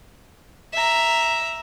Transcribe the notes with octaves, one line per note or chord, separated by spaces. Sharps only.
E5 A#5